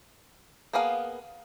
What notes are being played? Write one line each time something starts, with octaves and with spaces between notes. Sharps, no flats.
A#3 B3 G#4 F5